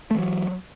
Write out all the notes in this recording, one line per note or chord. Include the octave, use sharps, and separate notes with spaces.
E3 F#3 A3